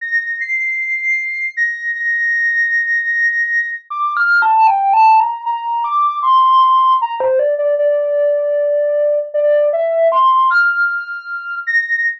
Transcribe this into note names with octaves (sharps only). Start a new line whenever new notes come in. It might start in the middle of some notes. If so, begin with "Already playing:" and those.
A#6
C7
A#6
A#6
D6
F6
A5
G5
A5
A#5
A#5
D6
C6
A#5
C5
D5
D5
D5
D5
E5
C6
F6
A#6